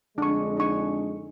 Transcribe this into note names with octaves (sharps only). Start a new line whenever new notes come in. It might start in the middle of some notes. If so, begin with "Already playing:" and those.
F2 D3 G#3 D4 C#6
D#4 C#6